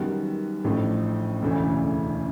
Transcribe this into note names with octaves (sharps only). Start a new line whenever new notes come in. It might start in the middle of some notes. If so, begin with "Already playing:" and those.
Already playing: F#2 D#3 G3 B3
A1 A2 F3 A3 D4
E1 D2 C#3 E3 A3